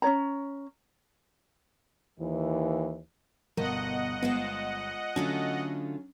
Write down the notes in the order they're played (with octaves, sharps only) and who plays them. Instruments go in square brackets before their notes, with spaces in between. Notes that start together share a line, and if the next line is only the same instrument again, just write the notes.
[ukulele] C#4 D#4 C#5 A#5
[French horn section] D#2 E3
[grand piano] G1 [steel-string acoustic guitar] B2 [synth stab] A#4 [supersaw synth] D#5 F#5
[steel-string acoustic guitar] G#3 F4 C5 [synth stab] B3
[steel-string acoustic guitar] D3 A3 F4 [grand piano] F#3 C#4 [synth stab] D4